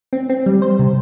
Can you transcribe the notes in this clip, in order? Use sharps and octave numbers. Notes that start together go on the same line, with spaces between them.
C4
C4
G3
C5
C3